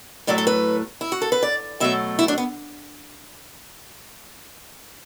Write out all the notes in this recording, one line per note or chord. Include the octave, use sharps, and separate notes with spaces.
A2 F#3 A3 D5
A4
B4
E4
F#4
A4
B4
D5
B2 F#3 A3 E5
E4
D4
B3